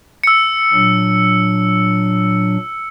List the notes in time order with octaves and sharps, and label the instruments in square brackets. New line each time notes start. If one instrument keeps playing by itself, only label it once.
[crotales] E6 C#7
[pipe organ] A#2 F#3 D4